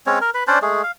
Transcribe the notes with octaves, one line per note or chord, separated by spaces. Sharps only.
G#3 C4 C#4 C#5
A#4
B4
C#4 D4 C5 D5
G#3 A3 G#4
F5